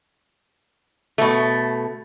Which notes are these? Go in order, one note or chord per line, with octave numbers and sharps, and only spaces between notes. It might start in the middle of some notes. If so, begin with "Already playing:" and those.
B2 A3